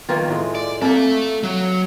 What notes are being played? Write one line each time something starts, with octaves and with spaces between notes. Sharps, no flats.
D#3 A#3 B3 F4 B4 F5
A2 G#3
D5
A#3 C4 A4 E5
F#3